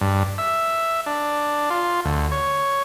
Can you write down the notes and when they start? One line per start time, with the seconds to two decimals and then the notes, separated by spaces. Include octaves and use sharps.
0.01 G2
0.38 E5
1.06 D4
1.70 F4
2.05 D2
2.32 C#5